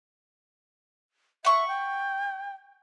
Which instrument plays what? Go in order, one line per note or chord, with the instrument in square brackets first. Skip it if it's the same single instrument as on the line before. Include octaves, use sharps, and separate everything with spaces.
[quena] E5 [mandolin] F#5 C#6
[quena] G5